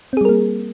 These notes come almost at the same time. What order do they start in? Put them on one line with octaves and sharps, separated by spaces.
C4 G#4 G3 A#4 A#3